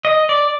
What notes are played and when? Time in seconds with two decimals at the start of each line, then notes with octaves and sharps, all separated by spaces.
0.05 D#5
0.29 D5